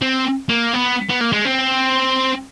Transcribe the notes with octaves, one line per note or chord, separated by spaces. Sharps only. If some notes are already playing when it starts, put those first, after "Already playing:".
C4
A#3
B3
B3
A#3
G#3
C4